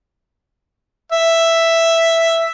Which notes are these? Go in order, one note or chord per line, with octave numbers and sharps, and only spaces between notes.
E5